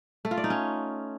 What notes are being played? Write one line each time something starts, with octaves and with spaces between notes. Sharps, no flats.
A3
F4
D5
D#4
C#4